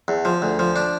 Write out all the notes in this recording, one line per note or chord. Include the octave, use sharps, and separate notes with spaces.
E2
F3
D2
F3
D4